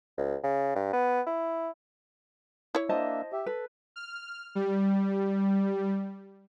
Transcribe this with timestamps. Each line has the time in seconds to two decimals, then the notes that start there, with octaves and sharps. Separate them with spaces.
0.18 C#2
0.44 C#3
0.76 G2
0.93 B3
1.26 E4
2.75 E4 C#5
2.89 A#3 D4 C5 D#5 E5 A5
3.32 G4 E5
3.46 A4 B4
3.96 F6
4.55 G3